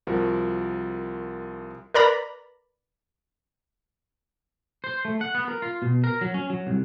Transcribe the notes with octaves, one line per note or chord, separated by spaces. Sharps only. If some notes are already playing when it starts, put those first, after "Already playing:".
C2 F3 F#4 A#4
A#4 B4 D5 A#5 B5 A#6
C5
A3
F#5
B3
A#4
F4
B2
A#4
F#3
C#4
F#3
C2